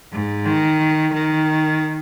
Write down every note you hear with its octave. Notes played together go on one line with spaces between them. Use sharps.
G#2
D#3
D#3